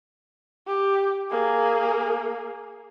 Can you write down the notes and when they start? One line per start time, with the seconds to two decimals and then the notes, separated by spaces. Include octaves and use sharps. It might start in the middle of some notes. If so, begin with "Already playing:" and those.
0.67 G4
1.30 A#3 G#4